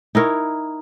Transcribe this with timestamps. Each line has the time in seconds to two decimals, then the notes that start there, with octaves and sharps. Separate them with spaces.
0.15 D#4 E4 A#4 C#5